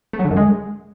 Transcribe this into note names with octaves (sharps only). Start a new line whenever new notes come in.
A3
F#3
D3
F#2
G#3